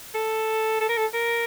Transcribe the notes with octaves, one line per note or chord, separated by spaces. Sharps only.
A4
A4
A#4
A4
A#4